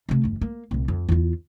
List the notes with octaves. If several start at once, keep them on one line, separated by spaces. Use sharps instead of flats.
C3 A3
G1 E2
A#3
C2 A#2
F2
E2 F4